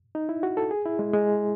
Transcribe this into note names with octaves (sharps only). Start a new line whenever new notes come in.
D#4
E4
F#4
A4
G#4
E4
G#3
G#3